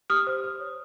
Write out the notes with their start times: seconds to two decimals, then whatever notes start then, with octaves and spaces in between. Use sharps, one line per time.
0.10 G4 D#6 F6
0.27 C5
0.44 C5
0.60 C#5